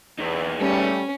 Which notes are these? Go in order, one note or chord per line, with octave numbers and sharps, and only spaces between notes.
E2 D#4 G#4 B4
G3 A3 C#4